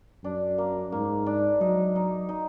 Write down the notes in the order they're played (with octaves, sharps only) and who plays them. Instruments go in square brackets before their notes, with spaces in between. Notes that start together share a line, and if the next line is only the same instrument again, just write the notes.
[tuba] F#2 [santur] D4
[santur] A#3
[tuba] G#2 [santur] A#3
[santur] D4
[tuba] F#3 [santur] D#4
[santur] D#4
D#4